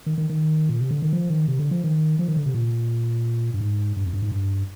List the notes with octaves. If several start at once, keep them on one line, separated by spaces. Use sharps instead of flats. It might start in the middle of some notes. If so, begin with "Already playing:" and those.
D#3
D#3
D#3
A#2
C3
D3
D#3
F3
D#3
C3
D3
F3
D#3
F3
D#3
D3
C3
A#2
G2
G#2
G2
F2
G2
G#2
G2